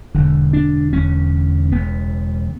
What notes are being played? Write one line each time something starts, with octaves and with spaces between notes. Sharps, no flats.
E1 E2 D3
D4
E1 E2 D3 C#4
E1 E2 C#3 B3